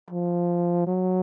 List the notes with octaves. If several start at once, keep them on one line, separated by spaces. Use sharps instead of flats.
F3
F#3